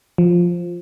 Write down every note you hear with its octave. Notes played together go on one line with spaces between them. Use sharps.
F3